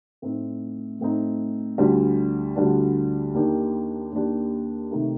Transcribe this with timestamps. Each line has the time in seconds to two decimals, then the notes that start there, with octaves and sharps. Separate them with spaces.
0.22 A2 A3 C4 D#4
1.00 A2 A3 C4 D#4
1.78 D2 D3 G3 D4
2.56 D2 D3 G3 D4
3.34 D#2 D#3 A#3 D4 G4
4.12 D#2 D#3 A#3 D4 G4
4.91 C3 D#3 A3 D#4 G4